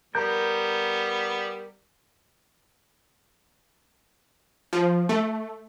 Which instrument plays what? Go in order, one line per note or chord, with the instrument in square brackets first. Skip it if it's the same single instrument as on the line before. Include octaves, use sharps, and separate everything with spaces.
[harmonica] G3 B3 [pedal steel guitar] A#4 A#5 G6
[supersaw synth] F3
A3